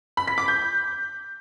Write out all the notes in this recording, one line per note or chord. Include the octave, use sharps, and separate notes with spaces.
B5
B6
D6
G6